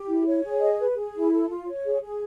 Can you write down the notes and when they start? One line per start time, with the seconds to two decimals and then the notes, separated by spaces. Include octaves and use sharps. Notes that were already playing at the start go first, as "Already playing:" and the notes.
Already playing: G4
0.08 E4
0.26 C#5
0.43 G#4
0.60 D#5
0.79 B4
0.96 G#4
1.14 E4
1.32 A4
1.49 F4
1.67 C#5
1.85 G#4
2.01 G#4